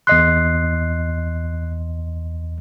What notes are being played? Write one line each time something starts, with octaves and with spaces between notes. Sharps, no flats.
E2 D#5 C6 F#6 C7